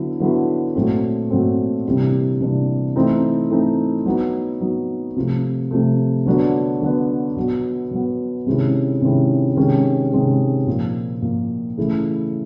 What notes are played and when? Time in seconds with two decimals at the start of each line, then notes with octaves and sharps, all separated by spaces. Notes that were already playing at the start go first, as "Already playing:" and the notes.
Already playing: D3 F#3 B3 E4
0.20 D3 F#3 B3 E4
0.75 A#2 F#3 A3 C4
1.30 A#2 F#3 A3 C4
1.85 C3 E3 G3 A#3 D4
2.41 C3 E3 G3 A#3 D4
2.96 E3 A3 C4 D#4
3.50 E3 A3 C4 D#4
4.06 F#3 B3 D#4
4.61 F#3 B3 D#4
5.16 C3 F3 A3
5.71 C3 F3 A3
6.26 D3 F#3 B3 D4
6.82 D3 F#3 B3 D4
7.37 B2 F#3 B3
7.91 B2 F#3 B3
8.46 C3 D#3 G#3 C#4 E4
9.02 C3 D#3 G#3 C#4 E4
9.56 C3 D#3 G#3 C#4
10.12 C3 D#3 G#3 C#4
10.67 A#2 F3 A#3
11.22 A#2 F3 A#3
11.77 C#3 E3 A3